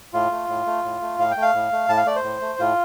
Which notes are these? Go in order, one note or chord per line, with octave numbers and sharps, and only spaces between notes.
A2 F4
A3
A2
A3
A2
A3
A2 F5
G5
A3
F5
A2
A3
A2 A5
F5
A3 D5
C5
A2
A3
A2 F4